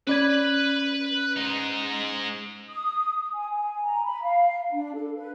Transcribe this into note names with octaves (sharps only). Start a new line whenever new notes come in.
C#4 B4 D5 B5 G#6
G#2 D#4
D#6
G#5
G#5
A#5
B5
F5
D4
A4
B4